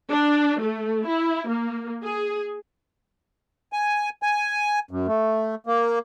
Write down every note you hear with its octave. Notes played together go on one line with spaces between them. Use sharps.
D4
A3
E4
A#3
G#4
G#5
G#5
F#2
A3
A#3